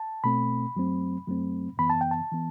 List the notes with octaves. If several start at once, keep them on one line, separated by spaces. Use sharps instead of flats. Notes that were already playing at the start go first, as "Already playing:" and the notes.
Already playing: A5
B2 A3 C4 B5
F#2 F#3 A3 C4
F#2 F#3 A3 C4
F#2 E3 B3 B5
A5
G5
A5
E3 B3